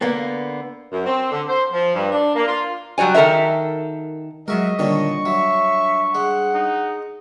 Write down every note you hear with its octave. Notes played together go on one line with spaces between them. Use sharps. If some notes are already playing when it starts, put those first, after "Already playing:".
D3 A#3 B3
F#2
C4
D3
C5
F3
G2
D4
A#3
F4
F#3 G3 F#4 C#5 G#5
D#3 A4 A#4 C5 E5
F#3 G#3 F#4 A#4 D#5 E5 C#6
A#2 D3 D#3 G3 D4 C#5 C#6
F#3 E5
G#3 F#5
D#4